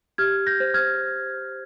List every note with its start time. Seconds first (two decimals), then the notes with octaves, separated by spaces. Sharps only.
0.18 G4 F6 G#6
0.47 G6 A#6
0.60 C5
0.74 F6 G#6